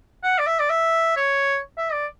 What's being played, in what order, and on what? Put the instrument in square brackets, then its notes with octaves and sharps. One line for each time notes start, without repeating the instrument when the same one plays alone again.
[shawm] F#5
D5
E5
D5
E5
C#5
E5
D5